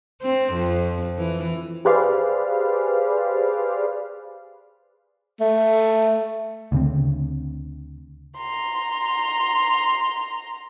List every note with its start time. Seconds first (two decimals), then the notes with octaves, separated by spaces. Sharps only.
0.22 C4
0.54 F2
1.18 E3
1.85 G4 G#4 B4 C5 D5 F5
5.41 A3
6.72 D2 C#3 C4
8.38 A#5 C6